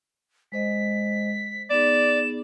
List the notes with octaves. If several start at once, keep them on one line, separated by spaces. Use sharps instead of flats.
G#3 C5 D#5 B6
B3 D#4 G#4 D5 E7